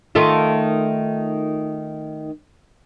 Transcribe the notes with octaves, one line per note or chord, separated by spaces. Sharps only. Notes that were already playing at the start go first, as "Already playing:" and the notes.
D#3 A3 F4